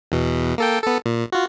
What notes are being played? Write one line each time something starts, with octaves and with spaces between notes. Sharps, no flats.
E2 B2
A#3 A4 G5
B3 A4
A#2
F4 F#4